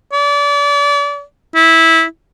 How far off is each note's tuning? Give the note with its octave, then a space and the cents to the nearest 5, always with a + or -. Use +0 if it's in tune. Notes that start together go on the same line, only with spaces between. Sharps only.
D5 -35
E4 -15